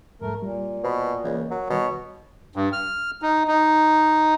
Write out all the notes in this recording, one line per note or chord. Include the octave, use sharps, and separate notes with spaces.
F2 G#2 G3 A3 A#4
A#2 G3
B2 B4 C5 B5
C#2 E3 A#3
F#3 A#4
B2 D#3 G3 C#5
G2
F6
D#4
D#4